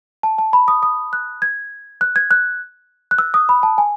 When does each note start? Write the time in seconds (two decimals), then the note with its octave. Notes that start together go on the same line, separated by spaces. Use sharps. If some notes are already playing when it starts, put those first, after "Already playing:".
0.23 A5
0.38 A5
0.53 B5
0.68 D#6
0.83 D#6
1.13 F#6
1.42 G#6
2.01 F#6
2.16 G#6
2.31 F#6
3.11 F#6
3.18 E6
3.34 D#6
3.49 B5
3.63 A5
3.78 G#5